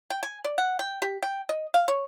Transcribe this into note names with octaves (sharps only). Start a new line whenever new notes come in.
G5
G#5
D5
F#5
G5
G4
G5
D#5
F5
C#5